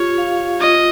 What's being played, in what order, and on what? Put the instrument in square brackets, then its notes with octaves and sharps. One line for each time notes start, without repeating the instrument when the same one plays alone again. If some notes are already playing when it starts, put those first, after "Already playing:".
Already playing: [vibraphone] F4 G4 [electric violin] C#5
[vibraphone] F5
[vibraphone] F4 [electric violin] D#5